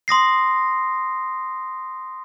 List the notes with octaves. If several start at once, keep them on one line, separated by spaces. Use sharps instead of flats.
C6 D#6 A#6 C7